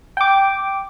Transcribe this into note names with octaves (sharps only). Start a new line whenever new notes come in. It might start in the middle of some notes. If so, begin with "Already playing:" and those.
G5 D6